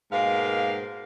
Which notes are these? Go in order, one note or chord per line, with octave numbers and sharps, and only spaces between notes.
G#2 B2 A#3 A#4 F5